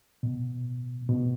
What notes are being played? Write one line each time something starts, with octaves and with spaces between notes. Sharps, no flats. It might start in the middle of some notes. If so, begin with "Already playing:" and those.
B2
B2